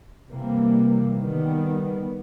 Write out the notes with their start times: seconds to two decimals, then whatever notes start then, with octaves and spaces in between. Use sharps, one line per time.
0.30 C3 E3 G3 A#3
1.20 D#3 G3 B3